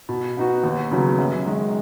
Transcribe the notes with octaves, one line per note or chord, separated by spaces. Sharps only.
B2
B3 D#4 F#4
D#2
C#3 F#3 B3
F#2
D#3 G#3